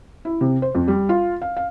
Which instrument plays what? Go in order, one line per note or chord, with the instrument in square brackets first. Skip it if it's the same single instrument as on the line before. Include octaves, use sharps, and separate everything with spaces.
[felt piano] E4
C3
C5
F2
G3
F4
F5
F5